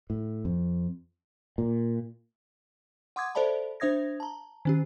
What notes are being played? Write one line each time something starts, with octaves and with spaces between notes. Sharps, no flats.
A2
F2
A#2
F#5 C6 D6 D#6 G#6
A4 C5 D5 E5 A5 B5
D4 C5 E5 D#6 G#6 A#6
A5 A#5
D#3 C#4 G4